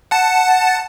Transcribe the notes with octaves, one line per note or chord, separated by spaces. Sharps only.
F#5 A5